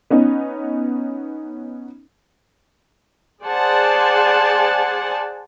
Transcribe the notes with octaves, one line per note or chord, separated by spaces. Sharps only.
B3 C#4 D#4
G#4 C5 D5 F#5 G#5 A5